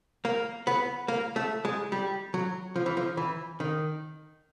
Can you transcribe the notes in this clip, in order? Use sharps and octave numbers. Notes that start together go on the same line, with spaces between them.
A#3
B3
A#3
A3
G#3
G3
F#3
F3
E3
F3
E3
D#3